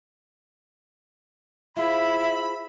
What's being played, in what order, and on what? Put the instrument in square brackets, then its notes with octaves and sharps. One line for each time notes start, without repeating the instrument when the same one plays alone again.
[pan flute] E4 [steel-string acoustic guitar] F4 G#4 C5 [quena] E5 [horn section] B5